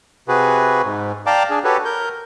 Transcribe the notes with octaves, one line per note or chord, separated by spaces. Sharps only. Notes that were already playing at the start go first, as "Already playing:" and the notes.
C3 F#4 G#4 B4
G#2
D5 F5 G5 A5 A#5 D6
D4 G#4
F#4 G4 A4 B4 C#5
A#4 G6